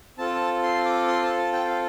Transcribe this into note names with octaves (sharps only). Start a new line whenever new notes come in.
C4 F4 A4 A5
C6
D6
C6
A5
A5
G5
F5